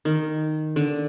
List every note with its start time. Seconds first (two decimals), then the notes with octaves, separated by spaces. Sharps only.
0.05 D#3
0.76 D3